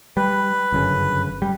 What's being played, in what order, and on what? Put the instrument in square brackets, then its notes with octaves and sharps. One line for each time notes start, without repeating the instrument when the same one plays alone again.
[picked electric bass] G3 [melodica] B4
[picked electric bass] G1 F#2 C#3
G3